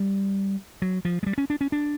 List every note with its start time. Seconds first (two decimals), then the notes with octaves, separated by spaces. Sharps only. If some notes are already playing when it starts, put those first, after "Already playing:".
Already playing: G3
0.82 F#3
1.05 F3
1.23 G#3
1.26 G3
1.38 C#4
1.50 D4
1.61 C#4
1.72 D4